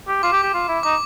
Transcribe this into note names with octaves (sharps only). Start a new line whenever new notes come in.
G4
F4 D6
G4
G4
F4
E4
D#4 D6